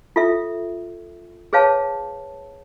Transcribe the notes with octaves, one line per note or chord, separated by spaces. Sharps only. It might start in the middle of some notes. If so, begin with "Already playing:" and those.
F4 A4 E5
G#4 B4 C#5 F5 A5